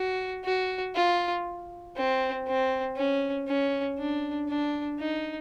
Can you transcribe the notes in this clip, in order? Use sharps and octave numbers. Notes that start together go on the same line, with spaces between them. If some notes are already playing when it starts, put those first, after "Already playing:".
Already playing: F#4
F#4
F4
C4
C4
C#4
C#4
D4
D4
D#4